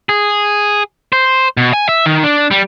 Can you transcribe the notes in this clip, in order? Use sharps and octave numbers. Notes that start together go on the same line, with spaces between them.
G#4
C5
B2
G#5
E5
D#3
D4
G3